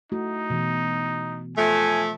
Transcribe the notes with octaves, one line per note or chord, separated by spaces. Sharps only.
A3 D#4 E4 F#4
B2 E3
F3 A3 G#5